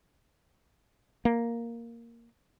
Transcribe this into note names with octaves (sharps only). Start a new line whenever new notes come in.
A#3